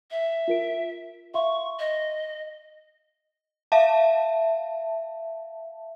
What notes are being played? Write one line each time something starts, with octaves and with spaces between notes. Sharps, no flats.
E5
F4 A#4 D7
E5 F5 C6 C#6
D#5
E5 F5 A5